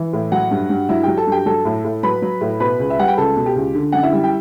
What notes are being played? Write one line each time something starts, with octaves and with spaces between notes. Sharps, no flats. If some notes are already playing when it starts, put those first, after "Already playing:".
Already playing: E3
A2
F#3 F#4 F#5
G2
G2
F#3 E4 E5
F#3 G4 G5
A4 A5
G2 G4 G5
F#3 A4 A5
A2
A2
F#3 B4 B5
F#3
A2
B2 B4 B5
C#2
E5
G3 F#5
G5
C#2 A4 A5
B2
G4 G5
C#2
D3
F#2 F#5
E4 E5
G3
G5